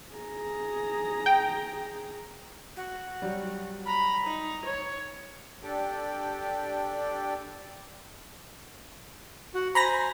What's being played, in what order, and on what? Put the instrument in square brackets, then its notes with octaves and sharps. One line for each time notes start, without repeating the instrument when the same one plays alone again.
[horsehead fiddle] G#4 A#5
[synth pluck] G5
[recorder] F#4
[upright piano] F#3 G3
[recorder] A#5 [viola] B5
[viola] D#4
C#5
[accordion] D4 G4 A4 D5 G5
[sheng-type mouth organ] F#4 F#5
[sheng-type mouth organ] C5 G#5 [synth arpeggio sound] A#5 B5 A#6